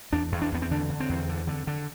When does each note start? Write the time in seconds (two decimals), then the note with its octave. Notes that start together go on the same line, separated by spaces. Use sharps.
0.12 E2 D4
0.32 E2
0.42 D4
0.52 E2 B3
0.62 C4
0.71 D3 D4
0.90 D3
1.00 C4
1.09 E2
1.29 D3
1.47 D3
1.67 D3